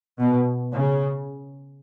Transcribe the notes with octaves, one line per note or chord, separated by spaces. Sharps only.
B2
C#3